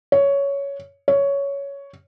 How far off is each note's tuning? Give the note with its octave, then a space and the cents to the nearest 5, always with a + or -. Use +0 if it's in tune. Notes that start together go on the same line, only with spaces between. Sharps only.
C#5 +10
C#5 +10